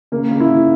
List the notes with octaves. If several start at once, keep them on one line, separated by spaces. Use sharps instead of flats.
C#3 A#3
C#3
E4
D#3